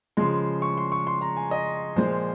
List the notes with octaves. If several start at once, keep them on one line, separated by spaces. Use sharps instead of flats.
C#3 F3 G#3 C6
C#6
C6
C#6
C6
A#5
G#5
D#5
A#2 F3 G#3 C5